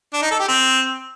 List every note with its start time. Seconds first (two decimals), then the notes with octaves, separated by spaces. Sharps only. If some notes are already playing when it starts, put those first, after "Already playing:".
0.13 D4
0.22 D#4
0.31 A4
0.39 G4
0.48 C4